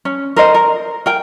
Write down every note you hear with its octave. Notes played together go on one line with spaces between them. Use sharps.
C#4
A#4 C5 D#5
A#4
A#4 G5